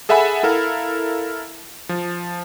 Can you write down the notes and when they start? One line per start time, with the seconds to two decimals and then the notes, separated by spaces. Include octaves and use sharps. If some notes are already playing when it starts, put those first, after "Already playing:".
0.09 G#4 A4 E5 F#5 G#5 B5
0.43 E4 A4 A#4 F5
1.89 F3